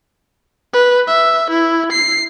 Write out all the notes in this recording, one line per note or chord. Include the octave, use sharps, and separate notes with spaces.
B4
E5
E4
C7